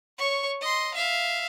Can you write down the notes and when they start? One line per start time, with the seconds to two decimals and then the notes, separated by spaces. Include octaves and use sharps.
0.18 C#5 C#6
0.61 D#5 C6
0.94 E5 F5